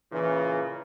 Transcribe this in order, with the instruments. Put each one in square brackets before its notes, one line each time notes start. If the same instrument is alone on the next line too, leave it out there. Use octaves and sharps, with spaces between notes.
[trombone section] A#2 C#3 [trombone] E3